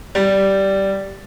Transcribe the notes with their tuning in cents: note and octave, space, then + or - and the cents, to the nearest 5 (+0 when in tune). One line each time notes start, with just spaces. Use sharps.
G3 -10